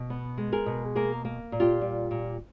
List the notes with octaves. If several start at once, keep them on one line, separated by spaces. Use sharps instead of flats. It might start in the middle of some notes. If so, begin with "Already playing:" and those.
Already playing: B2
B3
G#3
G#4 A#4
B2
A#3 G#4 A#4
A#3
A#2
F4 G4
G3
A#2